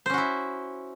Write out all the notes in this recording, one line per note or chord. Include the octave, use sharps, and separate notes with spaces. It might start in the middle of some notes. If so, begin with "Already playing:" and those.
C#4 E4 F#4 C5